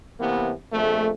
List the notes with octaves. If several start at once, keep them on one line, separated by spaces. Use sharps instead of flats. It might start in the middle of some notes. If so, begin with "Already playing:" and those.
C3 E3 A#3 B3
A#1 F2 A3